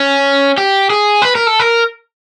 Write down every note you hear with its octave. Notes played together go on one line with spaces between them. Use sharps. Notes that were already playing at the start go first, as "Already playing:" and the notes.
Already playing: C#4
G4
G#4
B4
A#4
A4
A#4